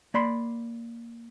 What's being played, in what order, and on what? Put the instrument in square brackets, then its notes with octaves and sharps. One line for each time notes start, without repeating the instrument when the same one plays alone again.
[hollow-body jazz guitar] A#3 D5 B5 C6